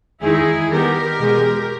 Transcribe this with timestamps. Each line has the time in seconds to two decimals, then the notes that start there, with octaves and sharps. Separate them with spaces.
0.20 E2 D#3 G#3 D#4 E4 G#4
0.70 D#3 G3 B3 D#4 G4 A#4
1.19 E2 B2 G#3